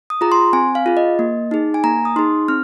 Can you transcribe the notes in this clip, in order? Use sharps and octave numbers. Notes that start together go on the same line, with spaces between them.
D#6
F4 G#4 A#5
C6
C4 G#5
F5
F4 G#4
D#5
A#3
D#4 G#4
G#5
A#3 A#5
D#6
D#4 G#4 C6
C4 F6